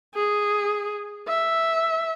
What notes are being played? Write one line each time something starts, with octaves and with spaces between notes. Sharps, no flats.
G#4
E5